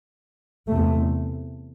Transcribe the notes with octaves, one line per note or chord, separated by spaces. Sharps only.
E2 C3 A3